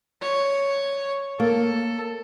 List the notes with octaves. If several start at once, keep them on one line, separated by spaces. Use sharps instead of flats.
C#5
A#3 A4